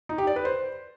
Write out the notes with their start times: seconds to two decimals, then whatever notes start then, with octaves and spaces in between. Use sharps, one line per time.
0.09 D#4
0.18 G4
0.27 D5
0.36 B4
0.45 C5